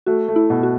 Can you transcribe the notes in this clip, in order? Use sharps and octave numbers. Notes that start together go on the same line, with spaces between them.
A3 F#4
A3
E4
B2
F#4